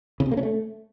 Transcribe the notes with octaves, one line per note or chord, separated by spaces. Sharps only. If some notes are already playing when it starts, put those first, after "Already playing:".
C#3
C3
A#3
C#4
A3